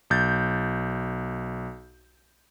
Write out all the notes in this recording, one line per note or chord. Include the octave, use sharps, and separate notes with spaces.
B1 G6 A6